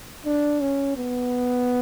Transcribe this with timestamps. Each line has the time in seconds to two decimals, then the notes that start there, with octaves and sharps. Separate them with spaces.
0.26 D4
0.61 C#4
0.97 B3